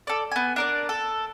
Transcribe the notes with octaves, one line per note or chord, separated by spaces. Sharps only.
A4 D5
B3 G#5
D4 A#4 D5
A4